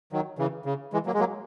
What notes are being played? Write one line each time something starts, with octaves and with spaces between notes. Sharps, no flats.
D#3 F#3
C#3 E3
C#3
E3 G#3
F#3 A#3
G#3
F#3 A#3